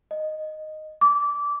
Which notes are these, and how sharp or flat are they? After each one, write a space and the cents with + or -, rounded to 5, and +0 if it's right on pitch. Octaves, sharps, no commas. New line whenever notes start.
D#5 -5
D6 -20